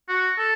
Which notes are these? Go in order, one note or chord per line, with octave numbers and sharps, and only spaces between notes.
F#4
A4